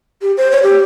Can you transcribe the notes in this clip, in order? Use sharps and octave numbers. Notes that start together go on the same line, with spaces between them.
G4
C5
C#5
G4